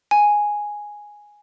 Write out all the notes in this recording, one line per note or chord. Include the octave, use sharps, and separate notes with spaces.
G#5